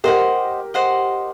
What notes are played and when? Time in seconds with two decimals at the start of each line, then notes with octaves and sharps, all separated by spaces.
0.04 G4 A#4 C5 D#5 F#5
0.74 C5 D#5 F#5